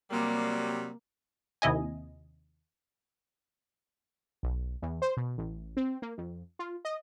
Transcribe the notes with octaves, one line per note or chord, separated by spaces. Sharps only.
C3 F#3 G3 A#3
D#2 C3 E4 D#5 G#5
B1
E2
C5
B2
A1
C4
A#3
F2
F4
D#5